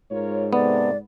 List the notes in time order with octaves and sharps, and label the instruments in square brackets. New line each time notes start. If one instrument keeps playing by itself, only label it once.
[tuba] G#2 [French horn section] F4 A#4 C#5
[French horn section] C3 A4 [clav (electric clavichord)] B3 [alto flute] D5